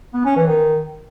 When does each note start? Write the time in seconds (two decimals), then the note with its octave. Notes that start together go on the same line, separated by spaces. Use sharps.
0.14 B3
0.25 C#4
0.36 E3
0.47 D#3